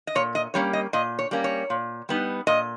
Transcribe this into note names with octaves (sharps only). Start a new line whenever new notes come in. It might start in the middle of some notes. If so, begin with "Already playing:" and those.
D#5
A#2 C#5
D#5
G3 A#3 C#4 C#5
D#5
A#2 D#5
C#5
G3 A#3 C#4
C#5
A#2
G3 B3 D#4
A#2 D#5